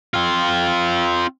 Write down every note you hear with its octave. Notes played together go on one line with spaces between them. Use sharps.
C4 F4